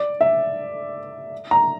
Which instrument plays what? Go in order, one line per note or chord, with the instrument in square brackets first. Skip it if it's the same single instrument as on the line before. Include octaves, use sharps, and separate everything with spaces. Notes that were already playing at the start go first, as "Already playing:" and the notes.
Already playing: [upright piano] D5
E5
A#5